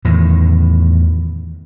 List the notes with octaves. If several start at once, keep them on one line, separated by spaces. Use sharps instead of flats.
E2 A2 D#3